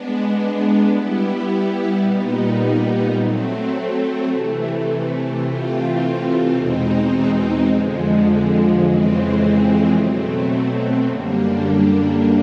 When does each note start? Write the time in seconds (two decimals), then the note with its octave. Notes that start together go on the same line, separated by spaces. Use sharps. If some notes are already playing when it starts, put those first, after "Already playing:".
Already playing: G#3 B3 D4
0.87 G3 B3 E4 G4
2.00 A#2 G3 B3 D#4
3.13 F#3 A3 C4
4.26 C3 E3 A3
5.40 C3 E3 A3 C4 F4
6.52 E2 B2 G#3 C4 D#4
7.67 F2 D3 F3 G#3
8.79 F2 C#3 E3 G#3 C4
9.93 B2 F#3 A3 C4
11.06 F#2 D3 G3 A#3 D4